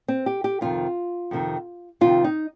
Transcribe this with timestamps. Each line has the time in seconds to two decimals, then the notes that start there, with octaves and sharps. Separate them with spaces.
0.08 C4
0.26 G4
0.44 G4
0.61 F2 C3 D#3 F4
1.31 F2 C3 D#3
2.01 F2 C3 D#3 F4
2.24 D#4